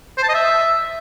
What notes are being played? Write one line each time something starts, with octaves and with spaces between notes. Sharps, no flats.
C5
A5
D#5
E5